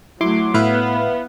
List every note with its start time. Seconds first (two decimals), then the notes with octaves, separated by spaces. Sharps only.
0.21 F#3 A3 E4 C6 D6
0.54 A2 B3 E4 B4 F5